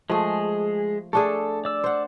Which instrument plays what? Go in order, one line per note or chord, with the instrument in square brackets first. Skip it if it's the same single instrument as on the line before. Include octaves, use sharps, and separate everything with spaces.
[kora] F3 A3 [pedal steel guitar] G#3 G#4
[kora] A3 D4 G#4 [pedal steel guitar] A4
[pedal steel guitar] D5 E6
[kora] C5 F#5